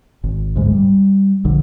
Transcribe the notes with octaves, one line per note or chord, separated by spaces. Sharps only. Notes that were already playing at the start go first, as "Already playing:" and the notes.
G#1
D2 G#2 G#3
G3
A#1 D3